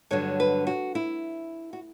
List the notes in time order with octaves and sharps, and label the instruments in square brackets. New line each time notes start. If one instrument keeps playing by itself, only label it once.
[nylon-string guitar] G2 D3 F#3 C#5
B4
F#4
E4
F#4